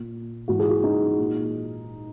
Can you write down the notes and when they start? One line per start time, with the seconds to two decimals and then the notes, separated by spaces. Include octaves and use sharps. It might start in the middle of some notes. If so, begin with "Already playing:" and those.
Already playing: A#2
0.48 G#2 E3 F#4
0.59 G#4
0.69 F#4
0.83 D#4
1.18 A#2